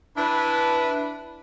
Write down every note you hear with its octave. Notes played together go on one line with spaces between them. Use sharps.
D4 E4 B4